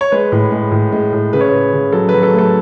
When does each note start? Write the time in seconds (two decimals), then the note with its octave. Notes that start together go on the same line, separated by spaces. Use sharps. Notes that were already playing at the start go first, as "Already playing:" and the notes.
0.01 C#5
0.12 G#3 B4
0.32 A2
0.52 G#3
0.72 A2
0.92 G#3
1.13 A2
1.33 C#3 B4
1.41 C#5
1.49 C#3 B4
1.73 C#3
1.92 F#3 A4
2.09 B4
2.14 F#3
2.23 A4
2.33 A3
2.39 A4